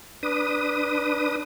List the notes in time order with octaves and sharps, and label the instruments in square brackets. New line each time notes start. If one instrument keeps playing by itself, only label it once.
[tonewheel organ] D4 B4 D#6